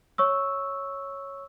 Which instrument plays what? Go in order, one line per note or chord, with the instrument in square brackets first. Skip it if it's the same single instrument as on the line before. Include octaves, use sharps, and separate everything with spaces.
[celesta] C#5 C#6 E6